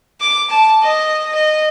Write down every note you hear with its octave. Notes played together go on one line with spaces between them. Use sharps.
D6
A5
D#5
D#5